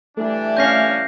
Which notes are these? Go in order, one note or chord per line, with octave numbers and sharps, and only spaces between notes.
E3 G3 A3 D4
C#4 F5 G6 A#6 C7